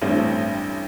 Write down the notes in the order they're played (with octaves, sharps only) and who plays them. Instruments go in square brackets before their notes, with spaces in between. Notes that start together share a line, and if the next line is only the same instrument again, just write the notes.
[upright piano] A1 G2 E3 A3 C4